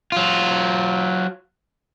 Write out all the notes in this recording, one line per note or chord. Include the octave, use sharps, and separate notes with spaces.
F#3 F4